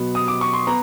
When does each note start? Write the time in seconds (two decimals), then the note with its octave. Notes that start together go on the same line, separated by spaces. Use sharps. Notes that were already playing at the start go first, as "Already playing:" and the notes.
Already playing: B2 F#3 B3
0.15 D#6
0.28 D6
0.41 C#6
0.53 C6
0.67 B3 A#5